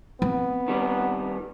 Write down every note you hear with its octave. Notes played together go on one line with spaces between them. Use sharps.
B3 C4
D#3 G3